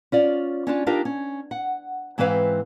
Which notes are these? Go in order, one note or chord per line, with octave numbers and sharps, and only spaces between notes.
C#4 F4 D5
C#4 D4 F4
D4 D#4 F4 G4 A#4
C#4
F#5
G#2 E3 C4 B4 F5